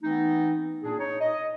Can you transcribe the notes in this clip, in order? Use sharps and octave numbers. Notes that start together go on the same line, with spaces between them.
E3 A3 B3 C4 D#4
A#2 A#3 D4 G#4
D#4 C#5
D#5